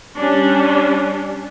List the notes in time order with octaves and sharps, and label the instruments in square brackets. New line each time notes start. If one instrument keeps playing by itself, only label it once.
[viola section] G3 C#4 D4